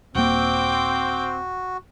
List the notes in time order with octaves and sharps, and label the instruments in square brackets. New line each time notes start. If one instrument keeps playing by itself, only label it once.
[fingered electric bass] D#1 A#3 [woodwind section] C4 [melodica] F#4 [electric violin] G5 D6